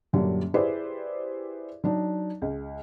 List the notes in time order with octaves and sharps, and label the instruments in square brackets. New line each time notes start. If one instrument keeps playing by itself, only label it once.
[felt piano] F#2 A#2 D3 F#3 G3 D4
E4 G4 G#4 B4 C5 D5
F#3 D4 D#4
C#2